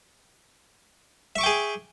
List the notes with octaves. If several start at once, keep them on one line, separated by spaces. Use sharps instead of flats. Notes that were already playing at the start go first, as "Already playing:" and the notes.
G#4 E5 G5 C#6 D6